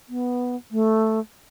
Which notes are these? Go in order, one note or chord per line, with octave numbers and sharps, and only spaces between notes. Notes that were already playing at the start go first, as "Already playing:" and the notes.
B3
A3